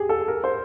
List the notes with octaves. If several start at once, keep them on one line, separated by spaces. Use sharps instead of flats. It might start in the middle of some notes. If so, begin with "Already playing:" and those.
Already playing: G4 G#4
A4
A#4
C5